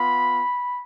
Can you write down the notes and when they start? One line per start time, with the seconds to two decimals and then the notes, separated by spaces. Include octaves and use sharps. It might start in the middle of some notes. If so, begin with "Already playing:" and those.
Already playing: B3 F4 B5